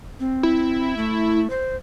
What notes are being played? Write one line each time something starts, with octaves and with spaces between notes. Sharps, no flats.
C4
E4
A3
C5